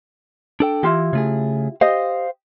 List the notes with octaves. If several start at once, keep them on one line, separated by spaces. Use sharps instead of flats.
D4 A4 G5
E3 E4 F4 G4
C#3 A3 G#4
G4 C5 D#5 F5